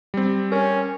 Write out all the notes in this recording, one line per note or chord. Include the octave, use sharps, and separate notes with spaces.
G3 C4
C#4 A#4